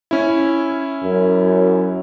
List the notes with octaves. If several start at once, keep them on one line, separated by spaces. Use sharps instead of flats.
C#4 E4
F#2